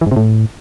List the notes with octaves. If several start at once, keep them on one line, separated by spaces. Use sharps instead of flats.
E3
G#2
C3
A2